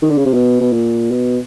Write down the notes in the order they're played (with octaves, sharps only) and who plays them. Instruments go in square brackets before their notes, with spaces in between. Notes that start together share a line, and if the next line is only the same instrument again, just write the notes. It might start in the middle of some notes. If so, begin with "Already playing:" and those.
[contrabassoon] D#3
D3
C#3
C3
B2
B2
A#2
B2